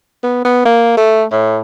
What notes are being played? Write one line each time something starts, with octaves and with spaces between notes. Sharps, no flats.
B3
B3
A#3
A3
A2